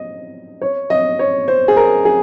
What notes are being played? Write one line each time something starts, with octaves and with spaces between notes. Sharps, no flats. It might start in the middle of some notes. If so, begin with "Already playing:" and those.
Already playing: D#5
C#5
D#5
C#5
C5
G#4
A#4
G#4